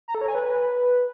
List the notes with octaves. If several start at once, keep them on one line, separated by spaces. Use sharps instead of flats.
A#5
A4
C#5
G#5
B4